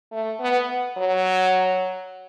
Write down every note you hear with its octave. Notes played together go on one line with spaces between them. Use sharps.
A3
B3
F#3